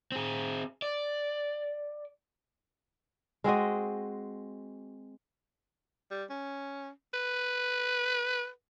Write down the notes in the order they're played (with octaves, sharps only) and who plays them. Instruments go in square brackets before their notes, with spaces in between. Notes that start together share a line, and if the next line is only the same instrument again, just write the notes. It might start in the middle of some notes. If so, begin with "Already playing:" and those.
[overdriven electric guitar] C4 G#4
D5
[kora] G#3 C4 F#4 D#5
[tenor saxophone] G3
C#4
B4